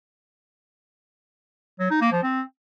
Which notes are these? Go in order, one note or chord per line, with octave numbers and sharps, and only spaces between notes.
F#3
D#4
A#3
F3
C4